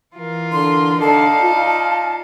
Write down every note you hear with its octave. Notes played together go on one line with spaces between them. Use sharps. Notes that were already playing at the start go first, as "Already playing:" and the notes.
E3 F4 A#4
D3 C6
D3 D#4 D5 F5 A5
F4